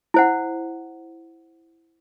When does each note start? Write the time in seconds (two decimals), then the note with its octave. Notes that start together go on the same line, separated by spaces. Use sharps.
0.14 E4 C5 F#5